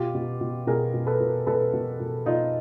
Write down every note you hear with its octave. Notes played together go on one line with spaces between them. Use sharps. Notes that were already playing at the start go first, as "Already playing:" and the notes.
Already playing: B2 F4 G4
B2
B2
B2 G#4 A#4
B2
A4 B4
B2
B2 A4 B4
B2
B2
B2 D#4 F4